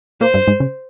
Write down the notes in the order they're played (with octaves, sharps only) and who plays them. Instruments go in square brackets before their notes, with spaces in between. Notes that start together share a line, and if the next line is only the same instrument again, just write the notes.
[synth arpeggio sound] A#2 A#3 [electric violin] C5
[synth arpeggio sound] G2 G3
G#2 G#3
C#3 C#4